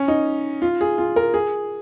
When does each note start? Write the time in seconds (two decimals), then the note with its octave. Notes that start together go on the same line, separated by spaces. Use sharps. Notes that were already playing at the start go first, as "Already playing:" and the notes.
Already playing: C#4
0.08 D#4
0.62 F4
0.81 G#4
0.98 F4
1.16 A#4
1.34 G#4